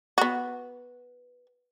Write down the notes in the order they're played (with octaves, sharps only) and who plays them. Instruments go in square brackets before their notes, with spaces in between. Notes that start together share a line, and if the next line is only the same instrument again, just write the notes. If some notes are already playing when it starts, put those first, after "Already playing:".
[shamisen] B3 F#4